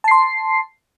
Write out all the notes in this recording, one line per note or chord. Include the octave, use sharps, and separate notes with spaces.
A5 C6 C7